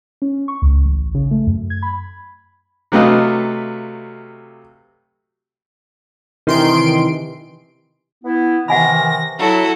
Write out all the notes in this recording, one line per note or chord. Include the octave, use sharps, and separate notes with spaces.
C#4
C#6
C#2
A1
C#3
A3
F#2
G#6
B5
C3 F#3 A3 B4 D#5 F5
C3 D#3 E3 C6 D7
B3 E4
C3 D#3 E3 F#5 G#5 B5 A#6
F#3 E4 F#4 A4